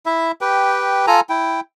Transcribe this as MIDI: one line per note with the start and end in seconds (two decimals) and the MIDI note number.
0.06 0.32 64
0.06 0.32 76
0.41 1.06 67
0.41 1.06 71
0.41 1.06 79
1.07 1.20 65
1.07 1.20 69
1.07 1.20 80
1.07 1.20 82
1.29 1.60 64
1.29 1.60 79